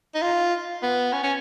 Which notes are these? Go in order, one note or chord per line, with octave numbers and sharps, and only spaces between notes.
D#4
F4
B3
C#4
C#4